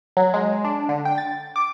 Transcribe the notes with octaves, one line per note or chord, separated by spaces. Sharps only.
F#3
G#3
D4
D3
G5
A6
D6